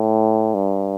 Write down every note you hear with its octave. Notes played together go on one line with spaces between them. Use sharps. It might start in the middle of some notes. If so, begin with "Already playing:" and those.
Already playing: A2
G2